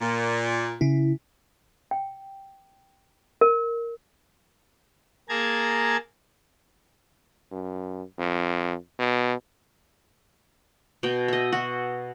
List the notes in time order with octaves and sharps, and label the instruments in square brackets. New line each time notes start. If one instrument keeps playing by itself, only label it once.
[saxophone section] A#2
[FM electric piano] C#3 E4
[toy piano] G5
A#4
[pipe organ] A#3 G#4 A5 A#5 G#6
[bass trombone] F#2
F2
B2
[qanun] B2 G5
D#5 E5
F#4